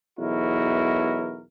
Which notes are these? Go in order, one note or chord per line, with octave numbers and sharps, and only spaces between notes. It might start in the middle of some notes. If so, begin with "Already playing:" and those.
B1 E2 E4 F#4 A#4